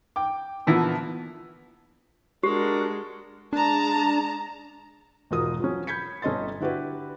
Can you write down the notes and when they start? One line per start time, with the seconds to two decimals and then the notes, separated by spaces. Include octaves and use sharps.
0.16 G5 D6
0.67 A#2 D3 E3 F3 B3 E4
2.43 G#3 D4 F#4 G4 A#4
3.53 G#3 D4 A5 A#5
5.31 E1 G#2 B2 F4 A#4 D#6
5.60 F3 F#3 C#4
5.87 B5 G6 G#6 B6 C#7
6.22 G1 C#4 A4 D#5 C6 A6
6.60 D3 E4 F#4 G4 B4